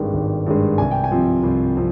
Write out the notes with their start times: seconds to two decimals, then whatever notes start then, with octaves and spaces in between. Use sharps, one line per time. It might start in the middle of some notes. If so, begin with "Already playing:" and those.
Already playing: G#1 G2 D#3 G#3
0.14 G#1
0.46 G2 D#3 G#3
0.78 C2 G#5
0.91 G5
1.04 G#5
1.11 C3 F3 C4
1.43 C2
1.75 F3 C4